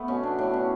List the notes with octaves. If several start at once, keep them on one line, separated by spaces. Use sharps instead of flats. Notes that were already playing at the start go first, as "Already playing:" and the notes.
Already playing: A3 B3
B2 C#4
D4
A2 D4
C#4